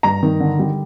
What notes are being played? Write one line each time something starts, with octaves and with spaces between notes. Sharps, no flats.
G2 A#5
D#3
D3
G3